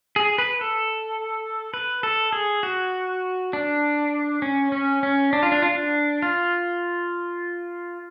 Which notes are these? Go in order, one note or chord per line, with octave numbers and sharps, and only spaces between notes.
G#4
B4
A4
B4
A4
G#4
F#4
D4
C#4
C#4
C#4
D4
F4
D4
F4
D4
F4